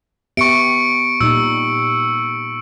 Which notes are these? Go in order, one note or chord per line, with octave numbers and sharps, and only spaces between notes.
B3 G4 E5 C#6 C#7 D7
A#2 G3 D#4 E6